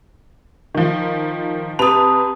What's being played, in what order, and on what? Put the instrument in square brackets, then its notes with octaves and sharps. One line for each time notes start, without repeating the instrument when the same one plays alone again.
[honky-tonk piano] D#3 F3
[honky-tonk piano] C3 B4 F7 [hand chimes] A5 D#6